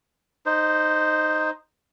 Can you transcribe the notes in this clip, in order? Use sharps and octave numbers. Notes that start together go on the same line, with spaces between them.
D#4 C5